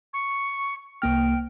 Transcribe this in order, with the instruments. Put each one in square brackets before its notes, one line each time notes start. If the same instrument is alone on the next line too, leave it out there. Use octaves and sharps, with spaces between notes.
[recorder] C#6
[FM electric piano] C2 A#3 F6 [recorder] G5